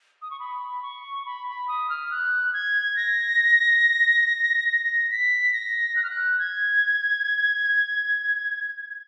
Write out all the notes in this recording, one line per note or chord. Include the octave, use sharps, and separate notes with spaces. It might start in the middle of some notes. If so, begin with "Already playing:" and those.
D#6
C#6
B5
C#6
B5
B5
D#6
F6
F#6
G#6
A#6
A#6
B6
A#6
F#6
F6
F#6
G#6